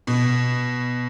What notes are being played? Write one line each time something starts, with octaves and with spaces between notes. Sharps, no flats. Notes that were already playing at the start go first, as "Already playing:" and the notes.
B2